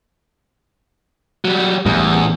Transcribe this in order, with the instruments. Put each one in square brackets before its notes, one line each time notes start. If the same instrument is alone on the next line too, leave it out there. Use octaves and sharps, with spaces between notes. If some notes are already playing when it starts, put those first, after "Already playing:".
[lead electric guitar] F#3 G3
[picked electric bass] A1 A2 G3 [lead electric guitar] E2